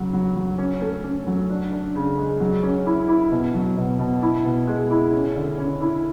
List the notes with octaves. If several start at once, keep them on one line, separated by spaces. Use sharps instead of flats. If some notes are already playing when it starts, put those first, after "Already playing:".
Already playing: C#3 F#3
F#3
F#3
C#4
A3
C#4
F#3
D4
D4
C#3
G#3
F#3
C#4
E4
E4
B2
F#3
B2
B2
E4
B2
G#3
E4
C#4
D3
C#4
E4